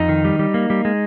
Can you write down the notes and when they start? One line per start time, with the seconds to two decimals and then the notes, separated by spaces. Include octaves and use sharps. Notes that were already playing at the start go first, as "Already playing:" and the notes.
Already playing: F2 D#4
0.09 D#3
0.25 G3
0.39 G3
0.54 A#3
0.70 G3
0.85 G#3